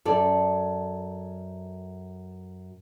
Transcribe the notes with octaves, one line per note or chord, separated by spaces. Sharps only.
F#2 A4 D5